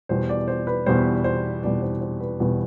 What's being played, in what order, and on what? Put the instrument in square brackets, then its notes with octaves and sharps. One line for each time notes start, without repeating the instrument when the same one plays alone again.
[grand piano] E2 B2 G3 C5
D5
C5
B4
E2 B2 G3 C5
C5
E2 B2 G3 D5
C5
C5
B4
E2 B2 G3 B4